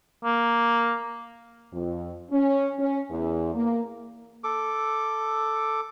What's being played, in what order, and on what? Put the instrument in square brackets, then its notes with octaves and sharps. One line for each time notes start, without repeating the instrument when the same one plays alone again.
[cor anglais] A#3
[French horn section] F2
C#4
C#4
E2
A#3
[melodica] A4 D6